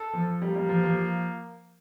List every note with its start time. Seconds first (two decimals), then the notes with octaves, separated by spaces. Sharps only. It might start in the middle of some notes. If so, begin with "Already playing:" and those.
Already playing: A4
0.13 F3
0.41 G3 A#3
0.55 G3
0.69 F3
0.84 F3